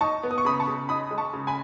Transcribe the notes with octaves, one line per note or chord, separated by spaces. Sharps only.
D#4 A5 C#6
B3
D#6
C#6
C#3 B5 D#6
A5 C#6
C#3
D#4 B5 D#6
G#3
A5 C#6
C#3
G#5 B5